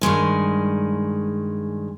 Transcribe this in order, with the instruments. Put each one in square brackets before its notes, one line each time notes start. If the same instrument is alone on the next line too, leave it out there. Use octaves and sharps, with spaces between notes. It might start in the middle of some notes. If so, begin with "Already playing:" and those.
[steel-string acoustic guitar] G2 D#3 G#3 G#5